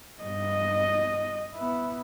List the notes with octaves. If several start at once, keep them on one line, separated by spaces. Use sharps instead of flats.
G2 D#5
B3 E4